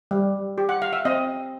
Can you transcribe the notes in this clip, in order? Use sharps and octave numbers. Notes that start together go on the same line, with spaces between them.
G3
G4
F#5
F5
E5
C4 D#5